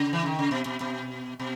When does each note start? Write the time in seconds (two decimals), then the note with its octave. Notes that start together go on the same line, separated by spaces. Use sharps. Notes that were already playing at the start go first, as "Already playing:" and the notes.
Already playing: C#3
0.13 E3
0.26 D#3
0.39 C#3
0.51 B2
0.66 B2
0.81 B2
1.39 B2